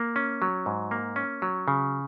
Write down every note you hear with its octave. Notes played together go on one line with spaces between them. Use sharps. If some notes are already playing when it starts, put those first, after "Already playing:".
Already playing: A#3
C#4
F#3
G#2
A#3
C#4
F#3
C#3